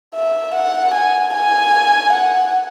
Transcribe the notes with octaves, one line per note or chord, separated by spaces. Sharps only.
E5
F#5
G#5
G#5
F#5